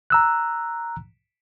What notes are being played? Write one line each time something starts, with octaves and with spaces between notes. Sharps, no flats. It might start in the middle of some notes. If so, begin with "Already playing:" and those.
A#5 E6 F#6